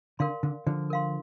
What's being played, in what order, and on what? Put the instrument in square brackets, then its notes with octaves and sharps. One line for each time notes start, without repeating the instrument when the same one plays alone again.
[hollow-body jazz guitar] D3 [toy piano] A#4 F5 C6
[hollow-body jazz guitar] D3
D3 F3
[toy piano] A#4 F5 C6